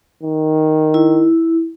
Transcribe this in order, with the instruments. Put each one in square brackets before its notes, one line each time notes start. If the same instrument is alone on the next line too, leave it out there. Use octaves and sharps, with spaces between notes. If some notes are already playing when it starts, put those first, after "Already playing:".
[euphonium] D#3
[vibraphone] E4